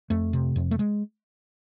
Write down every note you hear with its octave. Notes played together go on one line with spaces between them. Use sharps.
F2 A3
C3
F2
A3
G#3